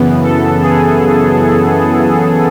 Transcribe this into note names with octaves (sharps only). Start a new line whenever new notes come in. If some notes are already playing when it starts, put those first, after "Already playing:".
Already playing: F#2 C#3 E3 B3
A4
G#4